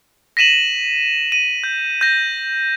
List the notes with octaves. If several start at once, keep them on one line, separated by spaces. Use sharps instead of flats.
A#6 B6 D#7 E7 F#7
D#7
G6
G6 A#6